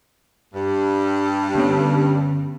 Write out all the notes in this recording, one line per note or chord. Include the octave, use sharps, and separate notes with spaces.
G2
D3 B3 C#4